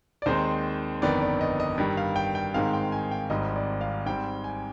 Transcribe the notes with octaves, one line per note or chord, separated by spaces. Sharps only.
D5
D#2 D#3 G#3 C4 C5
G1 F2 D#3 B3 D4 D5
D5
D#5
D#5
G2 D#3 G3
F5
G5
G5
G#2 D#3 G#3 C4 F5
G5
G#5
G5
G#1 G#2 G3 C4 D#5
D5
F5
G#2 G3 C4 G5
G#5